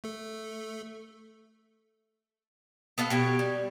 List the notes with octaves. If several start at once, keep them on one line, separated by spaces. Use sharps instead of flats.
A3 A4
B3 A4 F5 F#5
B2 G4 C#5
G3